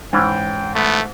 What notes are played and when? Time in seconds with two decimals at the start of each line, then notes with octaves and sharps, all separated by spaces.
0.13 G#2 E3 C#4 G5 A5
0.75 A3 B3